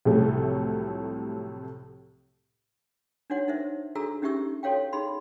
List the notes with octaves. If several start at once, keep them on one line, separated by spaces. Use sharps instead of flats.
C2 A2 C3 F3 F#3 A3
D4 D#4 F#4 C#5 F#5
D#4 A#4 C5 E5
D4 F#4 G#4 A4 A#5 E6
C#4 D#4 G4 E5 C#6 E6
F#4 A4 C#5 F5 G5
D#4 G#4 B5 C6